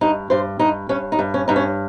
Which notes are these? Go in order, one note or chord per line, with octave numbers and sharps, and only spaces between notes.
G2 D#4
G2 C5
G2 D#4
G2 C#4
D#4
G2
C#4
G2 D#4
C#4